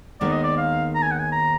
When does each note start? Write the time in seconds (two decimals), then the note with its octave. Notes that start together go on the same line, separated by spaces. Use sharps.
0.21 D#2 D#3 G#3 B3 D#4 D5
0.32 D#5
0.44 D5
0.58 F5
0.95 A#5
1.03 G#5
1.12 F#5
1.20 G#5
1.32 A#5